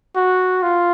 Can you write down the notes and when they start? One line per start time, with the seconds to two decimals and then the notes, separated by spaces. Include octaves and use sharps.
0.16 F#4
0.63 F4